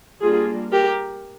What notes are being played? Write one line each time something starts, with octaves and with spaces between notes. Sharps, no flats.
G3 A#3 D4 F4 G#4
G4 A#4